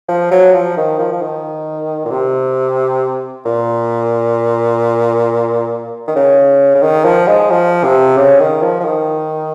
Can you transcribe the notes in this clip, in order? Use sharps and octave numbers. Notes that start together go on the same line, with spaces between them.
F3
F#3
F3
D#3
F3
F3
D#3
A#2
C3
A#2
D#3
C#3
C#3
D#3
F3
G#3
F3
C3
C#3
D#3
F3
F3
D#3